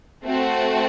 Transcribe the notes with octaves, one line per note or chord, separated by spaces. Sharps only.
A3 C4 F#4